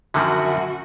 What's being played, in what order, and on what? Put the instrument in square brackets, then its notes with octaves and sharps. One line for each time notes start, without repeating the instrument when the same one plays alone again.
[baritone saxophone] F#2 [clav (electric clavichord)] D3 D#3 F3 [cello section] F#4 [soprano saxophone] E5